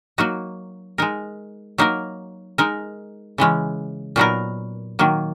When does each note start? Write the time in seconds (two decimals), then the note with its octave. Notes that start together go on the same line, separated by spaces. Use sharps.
0.18 F#3 A#3 D#4 F#4
0.98 G#3 D#4 A#4
1.78 F#3 A#3 D#4 A#4
2.58 G#3 D#4 A#4
3.38 C#3 E3 G#3 C#4
4.16 A#2 F#3 B3 D#4 A#4
4.99 D#3 F#3 A#3